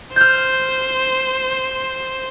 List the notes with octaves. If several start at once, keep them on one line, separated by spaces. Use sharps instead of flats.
C5 F6 G6